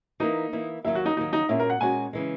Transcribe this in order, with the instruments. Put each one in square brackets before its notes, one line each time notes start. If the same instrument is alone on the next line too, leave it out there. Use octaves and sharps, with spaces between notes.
[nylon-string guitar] E3 A#3 E4 [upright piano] D#4
[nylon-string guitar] E3 A#3 E4
[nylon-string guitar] D#2 D#3 F#3 [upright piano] E4
[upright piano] F#4
D#4
[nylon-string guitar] D#2 D#3 F#3 [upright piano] D#4
[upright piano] D#4
[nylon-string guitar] A#2 G#3 C#4 F#4 [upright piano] E4
[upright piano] A#4
F#5
[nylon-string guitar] A#2 G#3 C#4 F#4 [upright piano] G#5
[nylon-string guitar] C#3 E3 G#3